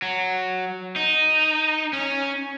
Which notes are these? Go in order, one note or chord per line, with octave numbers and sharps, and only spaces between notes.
F#3
D#4
C#4